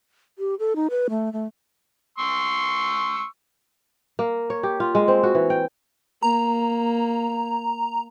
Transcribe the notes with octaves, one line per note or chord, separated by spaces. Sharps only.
G4
A4
D#4
B4
A3
A3
C6 C#6 E6
A#3
C#5
G4
F4
G#3
C4
F#4
E3
G5
A#3 A#5